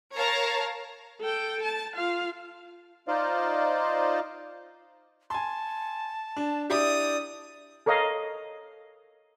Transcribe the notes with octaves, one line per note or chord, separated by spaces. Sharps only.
A#4 C#5 F5 A5 A#5
A4 G5
A5
F4 F5
D#4 F4 C5 D5 D#5 F5
G#5 A5 C6
D4
D4 E4 G4 D5 D#6
A4 A#4 C#5 D#5 F5